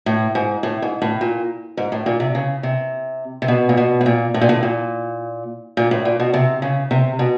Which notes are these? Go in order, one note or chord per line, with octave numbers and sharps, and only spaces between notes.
A2
G#2
A2
G#2
A2
A#2
G#2
A2
A#2
C3
C#3
C3
C3
B2
A#2
B2
A2
A#2
A2
A#2
A2
A#2
A#2
A2
A#2
B2
C3
C#3
C3
B2